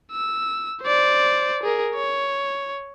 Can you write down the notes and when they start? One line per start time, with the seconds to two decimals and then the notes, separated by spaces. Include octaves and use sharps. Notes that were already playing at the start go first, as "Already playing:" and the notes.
0.12 E6
0.82 C5 D5
1.63 G#4 A#4
1.95 C#5